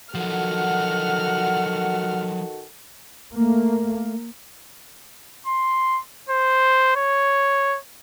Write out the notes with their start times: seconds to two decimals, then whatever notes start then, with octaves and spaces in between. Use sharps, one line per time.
0.15 D#3 F3 F#3 F#4 A4 F#5 F6
3.35 A3 A#3
5.47 C6
6.29 C5
6.96 C#5